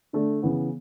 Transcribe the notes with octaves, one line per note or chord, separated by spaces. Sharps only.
D3 A3 D4
C#3 E3 B3